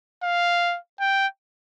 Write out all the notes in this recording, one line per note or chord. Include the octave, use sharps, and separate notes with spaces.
F5
G5